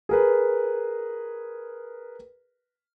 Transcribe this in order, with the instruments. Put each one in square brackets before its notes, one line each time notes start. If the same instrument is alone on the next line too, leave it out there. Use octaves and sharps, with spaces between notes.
[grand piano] G#4 A#4 B4